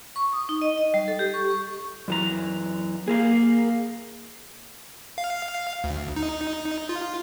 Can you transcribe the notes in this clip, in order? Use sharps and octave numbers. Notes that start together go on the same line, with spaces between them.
C#6
D#6
D#4
D#5
D#5
G3
A4
G4
C#6
C#6
F#2 E3 A#5
A#3 G#4 A#4 F5
F5
D2
D#4
F4